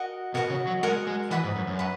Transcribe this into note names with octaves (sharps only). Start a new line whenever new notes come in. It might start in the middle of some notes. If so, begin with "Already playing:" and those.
Already playing: F#4 A#4 D#5 F#5
B2 F#4 A#4 D#5 F#5
C#3
F#3
G#3 F#4 A#4 D#5 F#5
G#3
E3 B4 F#5 B5 D#6
G#2
F#2
F#2
B4 F#5